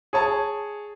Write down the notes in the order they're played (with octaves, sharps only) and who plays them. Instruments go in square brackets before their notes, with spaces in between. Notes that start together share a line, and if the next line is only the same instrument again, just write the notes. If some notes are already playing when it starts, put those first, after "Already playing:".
[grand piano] G#4 C#5 A5